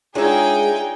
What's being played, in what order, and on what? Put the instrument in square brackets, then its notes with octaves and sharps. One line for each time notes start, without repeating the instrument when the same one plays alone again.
[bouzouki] G#3 E5 [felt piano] D4 F4 C#5 [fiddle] D#4 G5 [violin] G#4